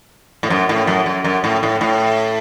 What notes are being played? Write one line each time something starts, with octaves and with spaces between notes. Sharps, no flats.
A2
F#2
A2
F#2
F#2
F#2
A2
A2
A2